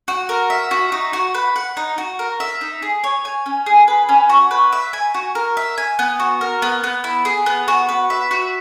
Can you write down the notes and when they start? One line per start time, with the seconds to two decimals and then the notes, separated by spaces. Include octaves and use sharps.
0.08 F#4
0.29 A#4
0.50 E5
0.71 F#4
0.92 D#4
1.13 F#4
1.34 B4
1.56 F#5
1.77 D#4
1.98 F#4
2.19 A#4
2.40 E5
2.61 D#4
2.82 G#4
3.04 C#5
3.25 G#5
3.46 C#4
3.66 G#4
3.88 B4
4.09 C#4
4.29 F#4
4.51 B4
4.72 E5
4.93 G#5
5.14 F#4
5.35 A#4
5.57 E5
5.78 G#5
5.99 B3
6.20 F#4
6.41 A#4
6.62 B3
6.84 B3
7.04 E4
7.25 G#4
7.46 B3
7.68 F#4
7.89 B4
8.10 E5
8.31 F#4